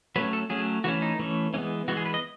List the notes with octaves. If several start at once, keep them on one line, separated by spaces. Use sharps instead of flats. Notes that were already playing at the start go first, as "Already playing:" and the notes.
F#3 A3 C#4 B4
A4
F#3 A3 C#4 G#4
E3 A3 C#4 F#4
D#4
E3 A3 C#4
E3 G#3 B3 C#4
E3 G#3 B3 F#4
G#4
B4
D#5